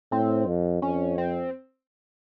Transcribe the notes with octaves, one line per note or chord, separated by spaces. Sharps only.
A2 C4
F2
F2 C#4
C4